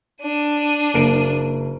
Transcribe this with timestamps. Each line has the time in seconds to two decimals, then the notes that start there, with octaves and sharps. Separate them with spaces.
0.22 D4 D#7
0.94 F#1 A#3 D7